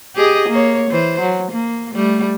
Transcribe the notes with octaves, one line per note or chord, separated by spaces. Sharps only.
G4 G#4 D#5
A#3 C#5
E3 C5
F#3
A#3
G3 A3